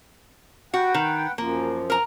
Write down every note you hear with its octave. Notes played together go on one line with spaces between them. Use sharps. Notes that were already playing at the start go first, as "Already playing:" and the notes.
F#4 B4 F#5 G5
D#3
F#2 F3 A#3
A#4 A#5